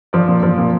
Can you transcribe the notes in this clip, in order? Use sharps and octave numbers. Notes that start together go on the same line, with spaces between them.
F3 D5
A#2
F3
A#2